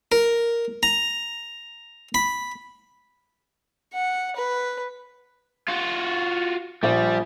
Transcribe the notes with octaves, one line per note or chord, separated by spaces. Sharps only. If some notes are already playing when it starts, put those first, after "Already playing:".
A#4
A#5
B5
F#5
B4
F4 F#4
A#1 G3